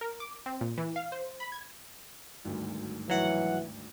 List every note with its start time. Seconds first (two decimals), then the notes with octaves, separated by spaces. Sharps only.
0.01 A#4
0.20 D6
0.46 C4
0.61 A#2
0.78 E3
0.96 F5
1.12 C5
1.40 B5
1.52 G#6
2.45 G#1 D2 G2
3.09 E3 F#3 F#5